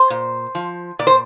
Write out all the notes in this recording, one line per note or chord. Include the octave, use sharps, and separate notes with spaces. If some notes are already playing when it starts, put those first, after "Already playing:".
Already playing: C5
A#2
F3
A#2 D5
C5